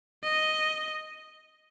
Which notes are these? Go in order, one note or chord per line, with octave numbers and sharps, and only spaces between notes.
D#5